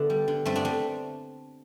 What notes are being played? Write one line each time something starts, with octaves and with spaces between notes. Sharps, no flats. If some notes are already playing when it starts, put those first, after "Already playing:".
Already playing: D3 A3 B3 D4
G3
D3
G2 A3 C4
B3 D4
A3 C4